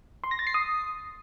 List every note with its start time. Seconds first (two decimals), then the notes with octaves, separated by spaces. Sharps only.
0.24 C6
0.31 A#6
0.39 A6
0.47 C7
0.54 D#6